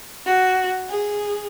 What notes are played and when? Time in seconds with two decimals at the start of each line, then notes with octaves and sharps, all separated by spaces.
0.25 F#4
0.88 G#4